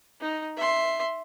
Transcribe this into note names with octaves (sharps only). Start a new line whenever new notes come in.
D#4
E5 C6